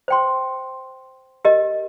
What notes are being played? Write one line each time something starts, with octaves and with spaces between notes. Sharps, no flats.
C5 G5 C6
G4 A#4 D#5